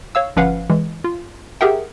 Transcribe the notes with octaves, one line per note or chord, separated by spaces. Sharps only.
C#5 F5 E6
G1 F3 C#4 B4 F5 F#5
E3 G#3
F4
G4 G#4 A#4 E5 F#5 G5